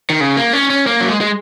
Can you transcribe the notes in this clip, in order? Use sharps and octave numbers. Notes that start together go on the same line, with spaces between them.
D#3
C#3
A#3
C#4
C#4
A#3
F#3
G#3
G#3